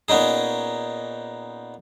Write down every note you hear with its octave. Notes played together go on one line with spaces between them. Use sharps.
A#2 B3 C#4 D#4 G#4